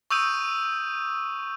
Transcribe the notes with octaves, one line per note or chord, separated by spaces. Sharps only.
C#6 D#6 E6 G6 D#7